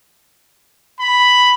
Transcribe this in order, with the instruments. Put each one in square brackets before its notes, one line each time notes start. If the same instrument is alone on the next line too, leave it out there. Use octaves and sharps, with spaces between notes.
[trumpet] B5